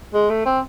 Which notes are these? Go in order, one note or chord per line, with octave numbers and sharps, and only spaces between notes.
G#3
A3
C4